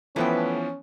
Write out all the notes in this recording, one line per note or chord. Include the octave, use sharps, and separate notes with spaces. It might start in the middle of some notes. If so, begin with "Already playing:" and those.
E3 F3 A3 B3 C#4 B4 G5